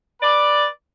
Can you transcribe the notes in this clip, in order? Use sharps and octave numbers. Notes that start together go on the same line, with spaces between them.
B4 D5